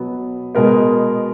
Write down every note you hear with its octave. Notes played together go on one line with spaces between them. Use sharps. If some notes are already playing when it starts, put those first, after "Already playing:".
Already playing: B2 F#3 B3
B2 G#3 B3 A#4